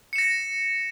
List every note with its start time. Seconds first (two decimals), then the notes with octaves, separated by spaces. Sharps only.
0.13 C#7
0.16 E7
0.18 A#6